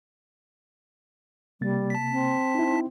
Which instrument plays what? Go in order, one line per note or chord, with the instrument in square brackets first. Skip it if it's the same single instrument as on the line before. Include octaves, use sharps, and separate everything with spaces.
[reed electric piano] C3 A#3 A6 [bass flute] G3
[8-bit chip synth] A5 B6
[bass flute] C4
[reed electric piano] D#4 E4